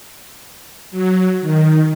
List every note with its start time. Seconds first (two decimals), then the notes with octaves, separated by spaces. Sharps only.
0.91 F#3
1.41 D#3